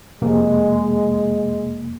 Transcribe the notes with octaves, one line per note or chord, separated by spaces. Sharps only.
F2 C3 G#3 A#3